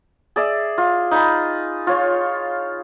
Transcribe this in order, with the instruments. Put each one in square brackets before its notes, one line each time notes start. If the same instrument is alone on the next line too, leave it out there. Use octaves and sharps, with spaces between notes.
[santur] G#4 D5 E5
F4
D#4 G#5 B5
F4 C#5